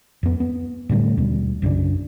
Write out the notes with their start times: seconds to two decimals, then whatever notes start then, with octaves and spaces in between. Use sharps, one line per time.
0.23 F2 B3
0.40 B3
0.89 A2 D3 G3 A3
1.17 D#2 B2 G3
1.62 B1 F#2 C#3 D4